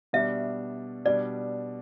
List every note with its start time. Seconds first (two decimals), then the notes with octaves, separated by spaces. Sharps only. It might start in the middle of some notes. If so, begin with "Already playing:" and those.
0.13 B2 G3 D4 E5
1.05 B2 G3 D4 D5